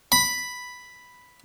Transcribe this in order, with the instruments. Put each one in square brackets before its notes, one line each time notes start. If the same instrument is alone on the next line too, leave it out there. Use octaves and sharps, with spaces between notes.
[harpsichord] B5